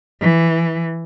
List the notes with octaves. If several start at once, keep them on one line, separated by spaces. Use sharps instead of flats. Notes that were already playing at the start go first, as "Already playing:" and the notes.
E3